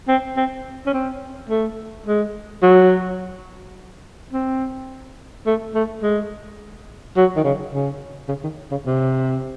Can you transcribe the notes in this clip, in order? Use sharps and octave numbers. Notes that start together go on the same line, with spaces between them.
C4
C4
C#4
C4
A3
G#3
F#3
C4
A3
A3
G#3
F#3
D#3
C#3
C#3
C#3
D#3
C#3
C3